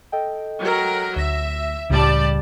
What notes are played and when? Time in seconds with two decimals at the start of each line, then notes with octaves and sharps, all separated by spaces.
0.12 A4 D#5 G5
0.61 F#3 A#4
1.16 D2 E5 A#6
1.90 C#2 A2 C#3 G3 D5 A5